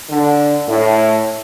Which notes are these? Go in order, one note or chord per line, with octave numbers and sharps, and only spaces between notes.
D3
A2